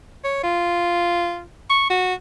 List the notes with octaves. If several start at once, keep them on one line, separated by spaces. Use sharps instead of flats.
C#5
F4
C#6
F#4